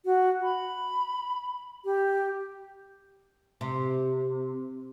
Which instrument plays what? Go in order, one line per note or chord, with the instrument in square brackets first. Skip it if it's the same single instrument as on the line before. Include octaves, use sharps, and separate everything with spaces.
[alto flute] F#4
B5
G4
[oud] C3